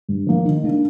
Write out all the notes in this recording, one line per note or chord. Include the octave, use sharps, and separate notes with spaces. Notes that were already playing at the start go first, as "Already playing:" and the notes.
G2
F3 A#3
D#3
A#3 D4